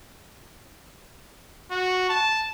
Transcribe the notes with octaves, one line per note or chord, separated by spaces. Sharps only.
F#4
A5